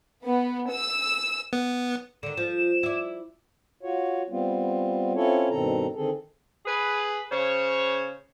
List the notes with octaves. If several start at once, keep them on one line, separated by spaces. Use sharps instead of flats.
B3
E6
B3
D3 D#3 E7
F3
E4 D5
F4 F#4 C#5
G3 B3 C4 F4
C4 C#4 E4 F4 A4 C#5
G2 B2 D#3 C4 A4 A#5
D3 D#3 C4 G#4 A4
G#4 B4
C#3 C5 C#5